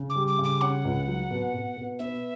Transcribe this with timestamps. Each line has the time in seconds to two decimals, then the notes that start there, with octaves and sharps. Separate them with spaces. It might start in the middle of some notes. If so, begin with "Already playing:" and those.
Already playing: C#3
0.10 D6
0.16 G3
0.27 D6
0.39 C#3
0.44 D6
0.61 C#4 F#5
0.85 C#2
1.08 F#3
1.31 B2
1.54 B2
1.77 B2
1.99 B3 E5